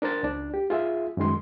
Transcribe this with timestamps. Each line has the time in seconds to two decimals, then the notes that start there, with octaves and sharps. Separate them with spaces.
0.02 D4 A#4 C5 A6
0.23 C#2 D4
0.54 G4
0.70 F4 G#4 E5
1.17 F#2 D#3 G#3 C6